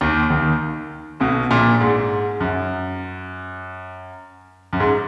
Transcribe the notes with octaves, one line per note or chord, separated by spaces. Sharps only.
D#2 D#3
D#2 D#3
B1 B2
A#1 A#2
G#2
F#2
F#2
G#2